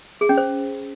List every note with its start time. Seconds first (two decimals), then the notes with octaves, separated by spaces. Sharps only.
0.21 G#4
0.29 C#4
0.37 C5